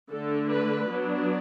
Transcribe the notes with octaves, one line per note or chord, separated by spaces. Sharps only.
D3 A3 D4 A4
B4
F#3 B3 D4